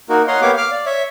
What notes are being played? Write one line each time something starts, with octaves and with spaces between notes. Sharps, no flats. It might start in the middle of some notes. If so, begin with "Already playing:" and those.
A#3 D#4 F#4 A#4
C#5 D#5 F5 F#5 A#5 C6
A#3 B3 G4 C#5 F5 D6
F5 D6 F6
D5
C#5 E5